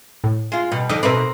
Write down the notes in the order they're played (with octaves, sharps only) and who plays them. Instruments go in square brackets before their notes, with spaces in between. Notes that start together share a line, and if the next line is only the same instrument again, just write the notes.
[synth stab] A2
[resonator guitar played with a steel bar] G#3 F4
[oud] B2 [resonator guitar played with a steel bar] G3
[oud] F2 D3 D#4 [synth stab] D#5 D6
[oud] B2 D#4 B4 [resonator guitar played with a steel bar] C4 A#4 [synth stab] E5 D6